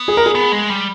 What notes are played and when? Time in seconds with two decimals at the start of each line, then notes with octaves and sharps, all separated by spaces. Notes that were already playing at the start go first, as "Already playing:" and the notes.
Already playing: B3
0.08 G#4
0.17 A#4
0.26 G#4
0.35 B3
0.52 G#3
0.70 G3